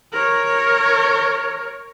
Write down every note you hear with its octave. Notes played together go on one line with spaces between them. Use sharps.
A#4 C#5